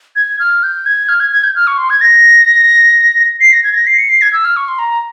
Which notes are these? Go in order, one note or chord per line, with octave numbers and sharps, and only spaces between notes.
G#6
F6
G6
G#6
F6
G#6
G#6
G6
F6
C#6
C6
G#6
A#6
C7
A#6
G#6
A#6
C7
C#7
C7
G#6
E6
F6
C#6
C6
A#5